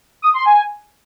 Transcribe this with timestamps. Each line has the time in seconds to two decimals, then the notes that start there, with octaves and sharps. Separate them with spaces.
0.22 D#6
0.34 C6
0.45 G#5